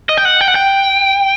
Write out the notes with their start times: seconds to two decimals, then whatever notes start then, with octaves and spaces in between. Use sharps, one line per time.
0.09 D#5
0.17 G5
0.25 F#5
0.41 G5
0.48 F#5
0.56 G5